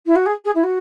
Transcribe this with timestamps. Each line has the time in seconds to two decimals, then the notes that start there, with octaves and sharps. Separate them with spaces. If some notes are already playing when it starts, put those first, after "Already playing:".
0.06 E4
0.15 F#4
0.25 G#4
0.44 G#4
0.55 E4
0.63 F#4